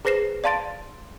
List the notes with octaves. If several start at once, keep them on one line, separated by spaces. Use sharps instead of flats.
G#4 B4 C5 A#6 C7 E7
D5 F5 A5 C6 A6 D7